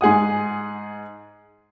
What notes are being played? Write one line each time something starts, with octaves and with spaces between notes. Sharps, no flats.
G#2 G#4 F#5 D#6